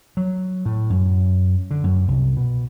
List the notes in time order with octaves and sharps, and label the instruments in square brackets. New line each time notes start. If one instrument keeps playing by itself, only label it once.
[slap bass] F#3
A2
F#2
D3
F#2
C2
B2